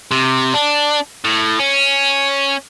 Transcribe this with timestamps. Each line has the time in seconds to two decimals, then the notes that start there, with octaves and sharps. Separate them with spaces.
0.11 C3
0.54 D4
1.25 A2
1.60 C#4